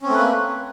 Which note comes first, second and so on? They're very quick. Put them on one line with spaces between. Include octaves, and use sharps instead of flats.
C#4 C4 A3 B4 A#3